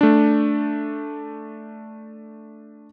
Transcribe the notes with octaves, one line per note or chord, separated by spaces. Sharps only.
A3 D4